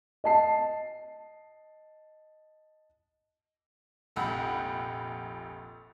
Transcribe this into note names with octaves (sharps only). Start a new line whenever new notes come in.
D#5 A5 C7
F1 A#1 F#5 G5 B5